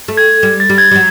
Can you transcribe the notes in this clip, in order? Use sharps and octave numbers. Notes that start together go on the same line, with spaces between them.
A3
G#6
G3
A6
G3
G#6
G3
F#3